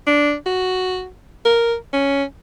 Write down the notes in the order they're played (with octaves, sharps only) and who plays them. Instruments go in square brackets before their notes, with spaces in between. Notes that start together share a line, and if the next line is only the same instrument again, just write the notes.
[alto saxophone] D4
F#4
A#4
C#4